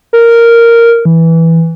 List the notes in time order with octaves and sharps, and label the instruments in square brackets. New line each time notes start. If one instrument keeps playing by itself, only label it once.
[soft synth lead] A#4
E3